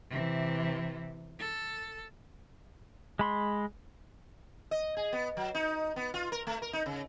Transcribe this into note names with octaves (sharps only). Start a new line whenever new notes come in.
C3 E3
A4
G#3 B5 C6
D#5
G#4
B3
F#3
D#4
B3
F4
A#4
A3
A#4
D#4
C#3